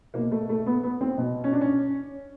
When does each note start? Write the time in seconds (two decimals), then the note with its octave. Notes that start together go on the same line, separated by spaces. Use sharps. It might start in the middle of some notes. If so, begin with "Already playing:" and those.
0.14 B2 A#3
0.31 A3
0.49 A3
0.66 B3
0.83 B3
1.01 C4
1.18 B2
1.44 C#4
1.53 D4
1.61 C#4